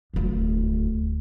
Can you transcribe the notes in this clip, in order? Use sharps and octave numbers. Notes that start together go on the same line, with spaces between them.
D#1 D2